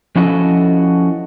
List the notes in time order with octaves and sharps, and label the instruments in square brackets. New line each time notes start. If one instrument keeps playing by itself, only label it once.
[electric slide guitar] F3 C#4 E4 F#4 A4 D#5